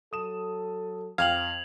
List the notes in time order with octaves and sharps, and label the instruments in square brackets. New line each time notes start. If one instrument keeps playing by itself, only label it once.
[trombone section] F#3 A4 [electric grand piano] D#6 E7
[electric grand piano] F2 G5 [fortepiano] F5 [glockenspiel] G#6 F7 F#7